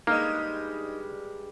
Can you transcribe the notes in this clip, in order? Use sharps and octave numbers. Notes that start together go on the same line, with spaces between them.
G2 G3 G#3 A#3 D#4 D#5 F6